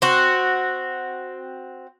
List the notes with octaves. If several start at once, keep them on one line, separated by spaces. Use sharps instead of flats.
C4 F#4